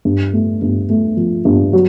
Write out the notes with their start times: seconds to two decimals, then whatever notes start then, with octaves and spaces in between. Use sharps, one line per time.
0.05 G2
0.33 A3
0.62 G2
0.90 A3
1.17 F3
1.45 G2
1.73 F#3